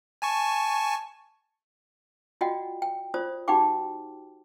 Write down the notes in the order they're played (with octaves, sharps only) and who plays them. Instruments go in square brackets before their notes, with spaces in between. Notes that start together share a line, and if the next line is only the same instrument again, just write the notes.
[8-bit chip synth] G#5 A5 C#6
[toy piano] F4 F#4 D5 D#5 F#5 G5
G5
F4 C5 D5 D#6
D#4 F#4 G4 F#5 G5 D6